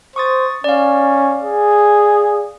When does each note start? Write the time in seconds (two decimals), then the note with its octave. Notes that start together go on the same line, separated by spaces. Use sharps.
0.16 C5 C#6 D#6 A6
0.64 C#4 D5 F5
1.43 G#4